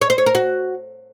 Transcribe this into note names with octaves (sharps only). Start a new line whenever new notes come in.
C#5
C5
C#5
A#4
F#4